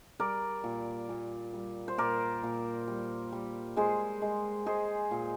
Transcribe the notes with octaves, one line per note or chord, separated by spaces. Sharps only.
G3 A#4 D5
A#2
A#2
G3
C5
A#2 A#4 D5
A#2
G3
G3
G#3 G#4 C5
G#3
G#3 G#4 C5
A#2